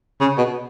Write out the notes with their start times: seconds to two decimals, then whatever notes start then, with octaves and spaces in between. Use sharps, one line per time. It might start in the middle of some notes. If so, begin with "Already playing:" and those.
0.21 C#3
0.38 B2